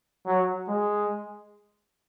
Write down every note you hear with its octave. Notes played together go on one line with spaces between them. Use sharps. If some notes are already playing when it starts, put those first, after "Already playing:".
F#3
G#3